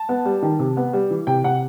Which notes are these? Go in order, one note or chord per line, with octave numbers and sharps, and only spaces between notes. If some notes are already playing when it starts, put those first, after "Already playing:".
Already playing: A5
B3
G3
D#3
C3
B3
G3
E3
C3 G5
C3 F#5